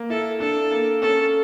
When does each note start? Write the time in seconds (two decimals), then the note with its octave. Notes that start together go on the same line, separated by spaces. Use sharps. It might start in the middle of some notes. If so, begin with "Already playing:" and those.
Already playing: A#3
0.10 E4 A4
0.40 D4 A4
0.71 A#3
1.02 C#4 A4